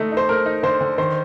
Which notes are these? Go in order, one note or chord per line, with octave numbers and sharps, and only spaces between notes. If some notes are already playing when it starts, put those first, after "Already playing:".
Already playing: D3 A3 D#4
D#4 C5
A3 A#4
D#4
D3 C5
D3
D#3 C5